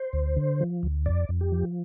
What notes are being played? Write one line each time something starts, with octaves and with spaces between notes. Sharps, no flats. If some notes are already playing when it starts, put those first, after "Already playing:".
Already playing: C5
D2
D3
F3
D2
F2 D5
F2
G4
F3